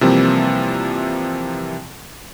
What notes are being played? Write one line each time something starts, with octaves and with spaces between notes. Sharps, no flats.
C3 E3 F3 G3 A#3 C4